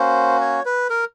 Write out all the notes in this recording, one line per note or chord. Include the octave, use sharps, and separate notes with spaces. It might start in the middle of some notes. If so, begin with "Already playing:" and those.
Already playing: A#3 C#4 F#4 C5
C#5
B4
A#4